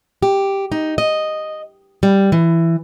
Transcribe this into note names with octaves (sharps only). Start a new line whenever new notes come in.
G4
D#4
D#5
G3
E3